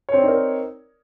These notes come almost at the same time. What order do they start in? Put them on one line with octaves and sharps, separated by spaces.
C#5 C4 D5 D#4 A#4